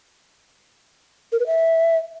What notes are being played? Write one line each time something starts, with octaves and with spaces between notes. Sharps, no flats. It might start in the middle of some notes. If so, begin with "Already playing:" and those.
A#4
B4
E5